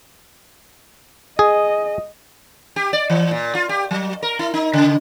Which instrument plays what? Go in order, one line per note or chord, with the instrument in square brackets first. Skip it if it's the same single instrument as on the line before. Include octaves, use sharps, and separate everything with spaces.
[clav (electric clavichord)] G#4 [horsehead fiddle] D#5
[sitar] G4
D5
E3
A#2
F4
G4
F#3
A#4
E4
D#4
C#3